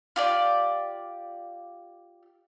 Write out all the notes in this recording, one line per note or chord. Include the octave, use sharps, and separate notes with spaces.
F4 G4 D5